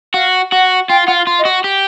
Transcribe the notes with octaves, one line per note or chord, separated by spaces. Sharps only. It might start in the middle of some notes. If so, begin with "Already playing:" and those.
F#4 F5
F#4 F#5
F4 G5
F4 F#5
F5
F4
D#5
F#4
G4